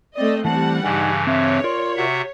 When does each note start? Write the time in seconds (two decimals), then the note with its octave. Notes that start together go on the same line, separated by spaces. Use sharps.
0.15 A3 C4 D5 D#5
0.44 E3 G3 A3 C4 F#5 A5
0.83 G2 C#3 E3 D#4 G#5
1.27 C4 C#5 E5
1.64 F4 A#4 D5 C6
1.97 C3 F#4 E5 F#5